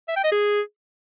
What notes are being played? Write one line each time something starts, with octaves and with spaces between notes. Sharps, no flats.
E5
G5
D#5
G#4